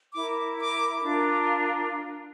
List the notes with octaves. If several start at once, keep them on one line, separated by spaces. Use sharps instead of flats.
E4 A#4 D6
D6
D4 F4 A#4